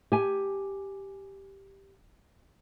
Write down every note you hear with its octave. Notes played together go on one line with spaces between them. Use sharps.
G4 G#5